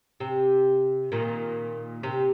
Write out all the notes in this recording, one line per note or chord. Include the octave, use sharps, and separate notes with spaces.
C3
A#2 D#3
C3